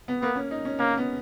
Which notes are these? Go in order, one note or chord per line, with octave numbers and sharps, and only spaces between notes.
B3
A#3 B3
C#4
D#4
C#4
A#3 C#4
B3